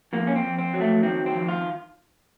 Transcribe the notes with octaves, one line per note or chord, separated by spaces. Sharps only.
F2 A#3
C#4
C4
F2
C4
F#3
A3
D#3 C4
C4
F2
F4